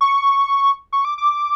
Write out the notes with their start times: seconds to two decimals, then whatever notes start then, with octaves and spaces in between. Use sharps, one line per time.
0.01 C#6
0.93 C#6
1.05 D6
1.18 D6